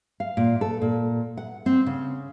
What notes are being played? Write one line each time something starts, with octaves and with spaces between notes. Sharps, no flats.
F5
A#2
A4
A#2
F#5
C4
C#3